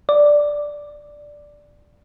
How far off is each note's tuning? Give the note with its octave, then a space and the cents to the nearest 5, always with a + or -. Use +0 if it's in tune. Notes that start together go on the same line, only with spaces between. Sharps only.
D5 +0